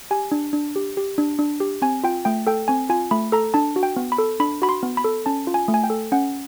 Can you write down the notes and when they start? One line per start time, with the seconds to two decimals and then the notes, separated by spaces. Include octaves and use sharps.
0.11 G4 G#5
0.32 D4
0.53 D4
0.76 G4
0.97 G4
1.18 D4
1.39 D4
1.60 G4
1.82 C4 G#5
2.04 F4 G5
2.25 A3 G5
2.47 A4 G5
2.68 C4 G#5
2.90 F4 G#5
3.11 A3 B5
3.32 A4 A#5
3.54 D4 A5
3.76 F#4
3.83 G5
3.96 B3
4.12 B5
4.18 A4
4.40 D4 B5
4.62 F#4 B5
4.69 C6
4.83 B3
4.97 B5
5.04 A4
5.26 C#4 A5
5.47 F4
5.54 G#5
5.68 A3
5.74 G#5
5.84 G5
5.90 A4
6.12 C#4 F#5